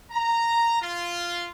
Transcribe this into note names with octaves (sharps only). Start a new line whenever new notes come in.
A#5
F4